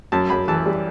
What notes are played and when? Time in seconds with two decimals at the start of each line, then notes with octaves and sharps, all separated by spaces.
0.12 F#2 A5
0.30 F#2 B5
0.48 E3 A5
0.66 G3